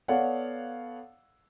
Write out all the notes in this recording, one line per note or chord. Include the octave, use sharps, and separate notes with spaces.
B3 A4 C#5 D5 F5 F#5